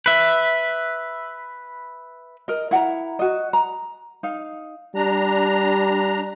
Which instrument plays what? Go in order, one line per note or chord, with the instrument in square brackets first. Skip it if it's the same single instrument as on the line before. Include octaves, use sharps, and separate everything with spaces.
[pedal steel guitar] B4 E5
[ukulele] A#4 D#5
E4 F#5 G#5 A#5
F#4 D#5
A#5
D#4 F5
[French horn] G3 [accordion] D4 A#5